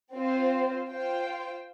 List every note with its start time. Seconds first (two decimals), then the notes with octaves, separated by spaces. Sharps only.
0.14 C4 F4 C5
0.88 F4 C5 G5